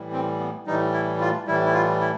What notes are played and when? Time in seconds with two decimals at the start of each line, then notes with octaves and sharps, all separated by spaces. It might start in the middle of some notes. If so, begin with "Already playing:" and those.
Already playing: A2 E3 G3
0.13 C4
0.39 B3
0.66 A2 E3 G3 D#4
0.93 E4
1.21 F4
1.47 A2 E3 G3 E4
1.65 E4
1.74 F4
2.01 E4